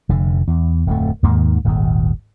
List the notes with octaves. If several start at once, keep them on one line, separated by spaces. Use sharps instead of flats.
F1 D3
E2
D1 F2 A3
D#2 G#2 D#3 A#3
D#1 G#1 D#2